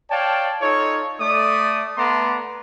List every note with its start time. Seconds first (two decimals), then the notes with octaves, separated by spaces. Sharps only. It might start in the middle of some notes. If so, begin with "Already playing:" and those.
0.11 C#5 D5 F5 G5 A5
0.62 D#4 F4 A4 C#5
1.21 A3 D5 D#6
1.98 A3 B3 A5 A#5 C6 D6